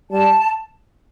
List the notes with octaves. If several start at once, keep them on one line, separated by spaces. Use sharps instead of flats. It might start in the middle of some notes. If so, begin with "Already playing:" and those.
G3 A5